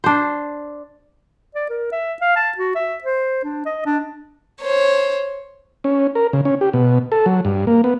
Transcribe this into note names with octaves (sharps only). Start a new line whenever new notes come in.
D4 C5
D5
A#4
E5
F5
A5
F#4
E5
C5
D4
D#5
D4
C5 C#5
C#4
A#4
C#3
C#4
G4
B2
A4
F#3
G2
A#3
B3